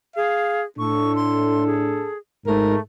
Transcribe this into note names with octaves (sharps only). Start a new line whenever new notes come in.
G#4 F5
A2 D4 A4 C#6
C6
G#4
G#2 A3 A#4